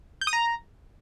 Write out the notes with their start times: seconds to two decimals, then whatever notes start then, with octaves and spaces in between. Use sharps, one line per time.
0.21 G6
0.27 D#6
0.33 A#5